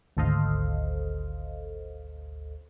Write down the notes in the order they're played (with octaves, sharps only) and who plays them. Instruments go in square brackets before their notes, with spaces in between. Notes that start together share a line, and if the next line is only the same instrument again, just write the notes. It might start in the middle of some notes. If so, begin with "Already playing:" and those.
[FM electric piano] G#1 D2 A4 C5 D#5 F5